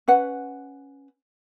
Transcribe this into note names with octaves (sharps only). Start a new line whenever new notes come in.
C#4 B4 F#5